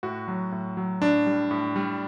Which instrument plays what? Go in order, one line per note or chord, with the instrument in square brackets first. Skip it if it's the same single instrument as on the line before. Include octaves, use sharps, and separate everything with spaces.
[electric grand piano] A2 F#4
F#3
A2
F#3
A2 D4
G3
A2
G3